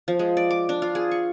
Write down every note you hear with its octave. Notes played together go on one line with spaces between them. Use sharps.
F3
G#3
D5
D6
D4
F4
G#4
C#6